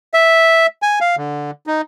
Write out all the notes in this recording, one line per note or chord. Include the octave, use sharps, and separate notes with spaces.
E5
G#5
F5
D3
D#4